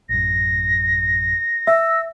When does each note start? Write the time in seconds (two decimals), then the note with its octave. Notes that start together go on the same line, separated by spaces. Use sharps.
0.09 A1 F#2 A#6
1.67 E5 E6